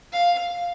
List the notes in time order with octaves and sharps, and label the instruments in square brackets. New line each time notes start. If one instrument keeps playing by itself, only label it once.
[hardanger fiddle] F5